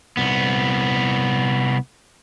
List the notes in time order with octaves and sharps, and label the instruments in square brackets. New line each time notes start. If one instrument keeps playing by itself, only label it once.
[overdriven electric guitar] C2 B3